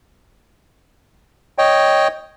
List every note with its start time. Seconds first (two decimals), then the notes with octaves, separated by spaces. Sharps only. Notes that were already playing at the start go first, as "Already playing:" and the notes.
1.58 C#5 D#5 G5